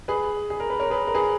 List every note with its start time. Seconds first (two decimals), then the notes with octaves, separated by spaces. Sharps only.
0.08 G#4 B4
0.50 G#4
0.60 A#4
0.70 B4
0.79 A#4 C#5
0.90 G#4 B4
1.07 A#4
1.14 G#4 B4